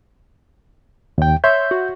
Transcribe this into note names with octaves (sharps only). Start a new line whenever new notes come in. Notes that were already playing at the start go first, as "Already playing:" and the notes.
D#2 G5
C#5 E5 C6 G6
F#4